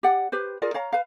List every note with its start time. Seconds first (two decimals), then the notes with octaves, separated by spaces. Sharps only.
0.03 G4 D5 F#5
0.32 G4 B4 C5
0.62 F4 G#4 A#4 D5
0.74 C#5 F5 A#5
0.93 B4 F5